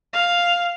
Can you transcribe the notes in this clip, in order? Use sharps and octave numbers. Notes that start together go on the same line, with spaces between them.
F5